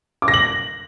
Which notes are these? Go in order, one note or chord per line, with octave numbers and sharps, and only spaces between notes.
D6
A#6
F#7